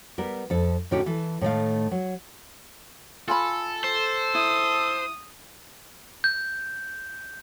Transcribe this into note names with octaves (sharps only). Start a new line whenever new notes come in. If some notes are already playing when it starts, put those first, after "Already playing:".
G3 B3 A#4
F2 A4
A2 D3 C#4 D#4 F#4 G4
E3 A4
A2 D#3 A3 F5
F#3
F4 A4 G#5 B5
C5
E4 D#6
G6